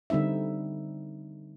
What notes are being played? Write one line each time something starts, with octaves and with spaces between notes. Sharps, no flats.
D3 G3 C4 D#4 E5